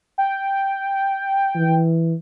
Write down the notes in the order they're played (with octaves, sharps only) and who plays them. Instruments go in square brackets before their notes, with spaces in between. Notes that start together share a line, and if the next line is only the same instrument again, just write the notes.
[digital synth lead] G5
[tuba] E3